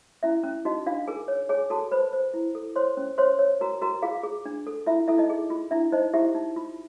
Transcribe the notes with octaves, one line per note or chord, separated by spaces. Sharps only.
C#4 E4 E5
C#4
D#4 F#4 D#5
D4 F4 F5
G#4 A#4 G#5
C#5
G#4 C#5 G#5
F#4 A4 A5
B4 C5 B5
C5
E4
A4
C5 C#5 C6
C#4
C5 C#5 C6
C#5
F#4 A#4 A#5
F#4 A#4 A#5
F4 G#4 F5
G#4
D4
A4
E4 F4 E5
E4 A4 E5
D#4 D#5
G#4
F4
D4 E4 E5
D#4 C5 D#5
E4 G4 E5
D#4
F4